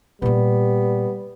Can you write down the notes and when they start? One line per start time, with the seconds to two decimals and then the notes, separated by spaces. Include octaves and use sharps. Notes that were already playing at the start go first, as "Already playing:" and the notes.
0.22 A#2 G3 A#3 B3